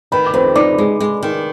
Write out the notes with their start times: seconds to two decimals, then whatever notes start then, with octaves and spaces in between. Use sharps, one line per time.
0.12 D#3 B4 B5
0.26 D6
0.34 F2 B4 B5
0.56 D#4 D5 D6
0.78 G#3
1.00 G#3
1.23 D#3